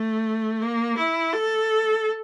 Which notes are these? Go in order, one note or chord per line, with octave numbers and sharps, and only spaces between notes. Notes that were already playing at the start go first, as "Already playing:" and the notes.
Already playing: A3
A#3
E4
A4